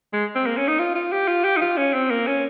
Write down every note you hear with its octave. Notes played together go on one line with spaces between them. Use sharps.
G#3
C4
A#3
C#4
D#4
F4
F4
G4
F4
G4
D#4
F4
C#4
C4
A#3
C#4